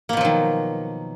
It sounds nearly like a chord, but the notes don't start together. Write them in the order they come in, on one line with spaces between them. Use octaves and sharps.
A#3 B2 F3 F#3 D#3